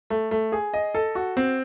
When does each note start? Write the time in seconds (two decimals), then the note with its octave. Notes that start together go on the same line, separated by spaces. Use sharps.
0.10 A3
0.31 A3
0.52 G#4
0.73 D#5
0.95 A4
1.15 F#4
1.37 C4